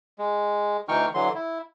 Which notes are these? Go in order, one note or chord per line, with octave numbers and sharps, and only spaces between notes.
G#3
D2 E3 D#4 G5 C#6 F6
D3 E3 F#3 C6
E4